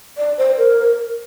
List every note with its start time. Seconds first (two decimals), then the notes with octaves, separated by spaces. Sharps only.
0.18 D5
0.38 C5
0.58 A#4